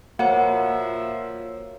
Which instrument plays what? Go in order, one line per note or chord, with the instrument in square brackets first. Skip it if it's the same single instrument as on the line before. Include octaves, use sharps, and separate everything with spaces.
[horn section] A#2 F3 E5 [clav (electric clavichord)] A#3 [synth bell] F#4 C#5 [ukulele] F#5